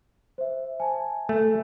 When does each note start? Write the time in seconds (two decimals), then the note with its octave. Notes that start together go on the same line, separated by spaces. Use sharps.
0.38 C5 E5
0.80 G#5 A5
1.29 A3